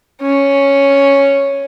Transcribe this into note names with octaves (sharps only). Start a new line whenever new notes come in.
C#4